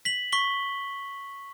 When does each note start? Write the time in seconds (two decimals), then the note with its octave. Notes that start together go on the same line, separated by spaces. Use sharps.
0.05 B6 F#7
0.32 C#6 B6 G7